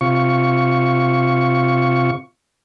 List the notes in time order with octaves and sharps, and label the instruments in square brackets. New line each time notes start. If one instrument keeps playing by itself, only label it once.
[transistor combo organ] C3 F4 C#6